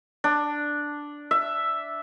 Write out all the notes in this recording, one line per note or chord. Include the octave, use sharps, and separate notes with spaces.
D4
E5